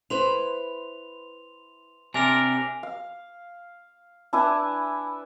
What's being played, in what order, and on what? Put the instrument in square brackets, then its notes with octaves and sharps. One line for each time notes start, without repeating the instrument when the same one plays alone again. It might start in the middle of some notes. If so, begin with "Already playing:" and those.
[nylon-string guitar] E4 B4 C5 [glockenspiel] C6 F7
[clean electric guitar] C3 D4 A#4 [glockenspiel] G#5 F7
[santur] F5
D4 E4 B4 G#5